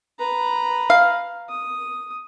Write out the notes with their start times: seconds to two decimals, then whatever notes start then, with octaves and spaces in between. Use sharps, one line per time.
0.19 B4 A#5
0.90 F5
1.50 D#6